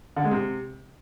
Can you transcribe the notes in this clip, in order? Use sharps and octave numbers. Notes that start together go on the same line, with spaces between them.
D3
G#3
C3